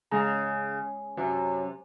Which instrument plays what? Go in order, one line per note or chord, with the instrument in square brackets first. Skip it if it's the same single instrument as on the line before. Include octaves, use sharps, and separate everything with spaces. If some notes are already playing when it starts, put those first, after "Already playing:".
[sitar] C#3 [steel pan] G#3 G#4 A#5
[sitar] C3 [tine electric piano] F#3 C#4